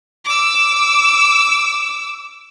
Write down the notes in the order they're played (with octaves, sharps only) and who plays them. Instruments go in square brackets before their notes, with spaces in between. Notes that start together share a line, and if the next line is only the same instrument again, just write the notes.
[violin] D6 E6